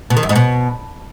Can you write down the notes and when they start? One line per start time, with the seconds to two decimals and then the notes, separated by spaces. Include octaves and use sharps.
0.10 B2
0.17 D#3
0.23 F#2
0.29 G#2
0.36 B2